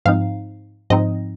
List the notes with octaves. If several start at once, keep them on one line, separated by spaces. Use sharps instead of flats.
G#2 F3 C4 D#4 F5
G#2 F3 C4 D#4 D#5